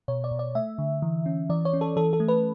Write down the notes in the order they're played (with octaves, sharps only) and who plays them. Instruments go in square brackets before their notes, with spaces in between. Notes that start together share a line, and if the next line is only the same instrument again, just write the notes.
[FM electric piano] B2 C#5
D5
B2
D5
A3 E5
D3
E3
C#4
E3 D5
C#5
C#4
A4
E3 A4
A4
A3
B4